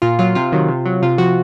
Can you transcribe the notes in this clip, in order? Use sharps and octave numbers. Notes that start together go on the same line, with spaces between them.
A#2 F4
F#3 F4
C3 F4
D#3 F#3
C3
F#3
C3 F4
F3 F#4